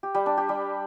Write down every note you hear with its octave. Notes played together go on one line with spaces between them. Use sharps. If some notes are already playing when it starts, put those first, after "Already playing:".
G4
G3
D4
G4
G3